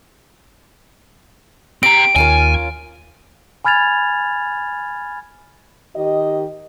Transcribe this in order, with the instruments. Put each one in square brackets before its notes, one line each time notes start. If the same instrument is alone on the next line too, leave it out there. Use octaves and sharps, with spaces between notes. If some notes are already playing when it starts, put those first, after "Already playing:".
[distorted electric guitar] C4 A#5 [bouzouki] G4 [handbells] D7
[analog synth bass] D#2 [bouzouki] C#4 F4 A#4 [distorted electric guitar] G#5
[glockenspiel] G#5 B5 F6 G#6 A6 F7
[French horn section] D#3 G4 D#5